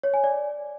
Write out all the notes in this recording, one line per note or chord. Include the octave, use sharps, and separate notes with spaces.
C#5
G#5
D5